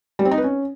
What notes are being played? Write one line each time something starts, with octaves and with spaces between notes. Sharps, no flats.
G3
C4
D#4
B4
C#4